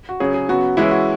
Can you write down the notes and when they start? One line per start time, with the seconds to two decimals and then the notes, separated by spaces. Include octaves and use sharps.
0.09 F#4
0.20 C#3 F#3 C#4 G#4
0.34 G#4
0.49 C#3 F#3 B3 F#4
0.77 E3 G#3 C#4 E4
0.91 F#4